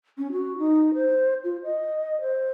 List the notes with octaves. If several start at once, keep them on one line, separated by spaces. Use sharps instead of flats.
C#4
F#4
D#4
C5
F4
D#5
C5